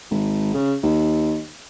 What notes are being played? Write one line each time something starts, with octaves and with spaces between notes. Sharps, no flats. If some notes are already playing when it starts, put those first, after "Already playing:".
G#1
C#3
D#2